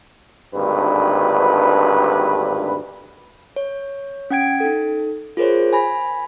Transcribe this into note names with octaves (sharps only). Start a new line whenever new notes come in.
G#1 D2 G2 B4
C#5
C#4 F#5 G5 G#6 D7
D#4 A4
F4 G#4 A#4 C5 C#5
G#5 B5 A#6